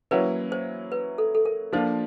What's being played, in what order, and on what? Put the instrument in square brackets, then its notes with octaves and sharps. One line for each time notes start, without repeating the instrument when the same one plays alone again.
[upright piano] F#3 A#3 C#4 E4 [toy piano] B4
[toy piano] C5
B4
A4
A4
A#4
[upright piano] F3 A#3 D4 F4 [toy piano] C5